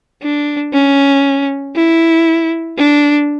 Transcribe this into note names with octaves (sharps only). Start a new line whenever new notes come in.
D4
C#4
E4
D4